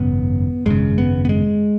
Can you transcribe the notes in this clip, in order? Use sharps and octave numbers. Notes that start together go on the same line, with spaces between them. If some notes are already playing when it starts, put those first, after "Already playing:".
Already playing: G#1 F#2 C#3 B3
G#1 F#2 C#3 G#3
B3
B3
G#3